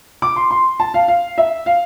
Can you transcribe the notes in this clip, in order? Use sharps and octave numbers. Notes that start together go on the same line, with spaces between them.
D6
C6
C6
A5
F5
F5
E5
F5